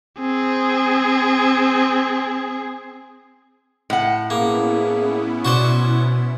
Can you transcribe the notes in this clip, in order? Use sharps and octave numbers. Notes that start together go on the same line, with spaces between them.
C4 G#4
A2 F#5
A#3 B3 C#4 E4 G#4
B2 F#4 C5 D5